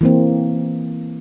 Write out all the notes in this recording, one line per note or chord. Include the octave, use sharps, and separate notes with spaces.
E3 A#3 C4